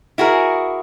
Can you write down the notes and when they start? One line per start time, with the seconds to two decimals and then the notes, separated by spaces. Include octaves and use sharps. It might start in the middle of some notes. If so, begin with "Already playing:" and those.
0.18 E4 F#4 G#4 A#4